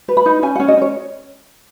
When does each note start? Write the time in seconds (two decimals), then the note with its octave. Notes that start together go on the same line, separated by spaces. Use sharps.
0.08 B4
0.17 B5
0.26 D#4
0.43 C#4 G#5
0.56 F#5
0.60 C#4
0.68 D#5
0.77 C#4 C#5